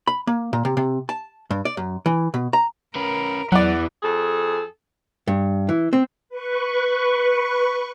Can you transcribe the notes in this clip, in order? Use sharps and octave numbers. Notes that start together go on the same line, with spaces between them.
B5
A#3
A#2
C3
C3
A5
G2
D5
F#2
E3
B2
A#5
C#4 A#4 B4
E2 E3 F#3 D5 F#5
F2 G#4 A4
G2
E3
C4
B4 C#6